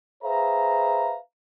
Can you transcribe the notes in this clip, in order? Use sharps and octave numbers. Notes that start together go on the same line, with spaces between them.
G#4 B4 C5 E5 F5 A#5